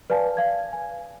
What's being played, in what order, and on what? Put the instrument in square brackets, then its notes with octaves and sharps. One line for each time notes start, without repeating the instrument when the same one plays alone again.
[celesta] B4 D5 F5 G#5 A5
F5 G#6
G#5